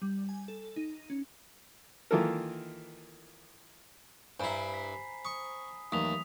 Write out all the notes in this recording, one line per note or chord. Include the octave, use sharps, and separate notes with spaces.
G3
G#5
A4
D#4
C#4
D#3 E3 A#3 F4 A4 A#4
G2 E4 C5 G#5 A#5 B5 C7
B6
C#6 D#6
D#2 E3 F#3 A3 D#6 B6 F7